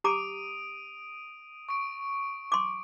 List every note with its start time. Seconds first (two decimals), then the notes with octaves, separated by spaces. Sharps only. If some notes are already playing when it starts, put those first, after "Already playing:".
0.04 G4 A#5 D6 D#6 D7 D#7
1.69 C#6 D7
2.52 C6 D6